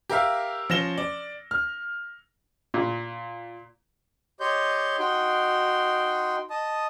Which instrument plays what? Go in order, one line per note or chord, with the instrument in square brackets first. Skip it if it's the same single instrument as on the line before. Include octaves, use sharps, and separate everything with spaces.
[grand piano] G4 A#4 E5 F5
F3 C#4 A#6 E7 G7
D5
F6
[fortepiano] A#2
[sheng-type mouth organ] G4 C#5 D#5 C6 G6
D#4 F#4 G5 C6
D#5 A5 D#6